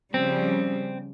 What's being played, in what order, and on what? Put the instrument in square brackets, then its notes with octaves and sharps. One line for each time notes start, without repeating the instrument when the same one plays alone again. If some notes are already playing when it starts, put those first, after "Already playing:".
[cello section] C#3 F3 G3 [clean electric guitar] C4